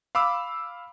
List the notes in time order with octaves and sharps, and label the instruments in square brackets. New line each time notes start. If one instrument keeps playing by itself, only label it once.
[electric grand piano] F5 B5 D6 E6